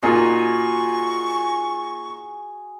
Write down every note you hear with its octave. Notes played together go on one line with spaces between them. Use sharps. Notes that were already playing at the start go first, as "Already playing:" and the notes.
A#2 D#4 F#4 G#4 F#5 C#6